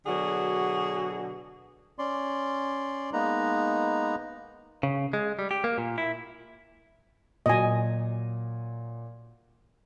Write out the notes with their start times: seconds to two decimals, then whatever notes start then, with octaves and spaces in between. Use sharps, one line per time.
0.07 B2 D3 F#3 F#4 G#4
1.99 C#4 D5 C6
3.13 G#3 A#3 B3 D#4 B4 A#5
4.83 C#3
5.13 G#3
5.39 G3
5.51 G4
5.64 A#3
5.78 A#2
5.98 E4
7.46 A#2 F#3 D#5 G#5